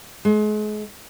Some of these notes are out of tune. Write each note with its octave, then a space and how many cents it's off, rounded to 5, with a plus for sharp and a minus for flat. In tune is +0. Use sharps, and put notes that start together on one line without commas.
G#3 +35